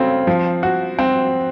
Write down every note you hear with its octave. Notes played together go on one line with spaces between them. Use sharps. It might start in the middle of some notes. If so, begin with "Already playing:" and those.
Already playing: C#3 F#3 A3 C4
F3
F#4
C4